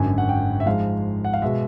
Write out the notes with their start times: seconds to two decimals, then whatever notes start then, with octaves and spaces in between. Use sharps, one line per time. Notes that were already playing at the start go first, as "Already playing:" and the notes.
Already playing: G#1 F#2 D3 G#5
0.18 F#5
0.29 G5
0.60 E5
0.66 G#2 F3 G#3 F5
1.24 F#5
1.34 F5
1.42 B2 G#3 E5